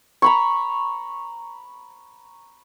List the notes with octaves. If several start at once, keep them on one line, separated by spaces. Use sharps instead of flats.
A#5 B5 C#6